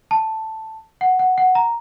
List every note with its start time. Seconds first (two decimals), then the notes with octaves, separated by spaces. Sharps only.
0.11 A5
1.01 F#5
1.19 F#5
1.38 F#5
1.55 A#5